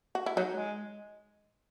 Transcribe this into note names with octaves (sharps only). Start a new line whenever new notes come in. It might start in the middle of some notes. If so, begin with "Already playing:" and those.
F#4
E4
F#3 D#4
G#3